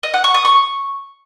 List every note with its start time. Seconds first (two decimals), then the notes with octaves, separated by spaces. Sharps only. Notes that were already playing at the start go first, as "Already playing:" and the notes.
0.03 D#5
0.14 F#5
0.24 C#6
0.34 D#6
0.45 C#6